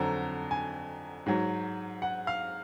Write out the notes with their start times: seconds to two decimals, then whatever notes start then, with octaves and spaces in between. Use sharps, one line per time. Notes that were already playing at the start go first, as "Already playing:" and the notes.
Already playing: F2 D3 F#3 A#5
0.51 G#5
1.26 G#2 F#3
2.02 F#5
2.27 F5